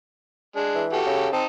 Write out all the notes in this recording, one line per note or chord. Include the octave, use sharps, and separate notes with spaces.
G#3 D4
E3
F#4 G4 A4
C#3
C4 D#4 A5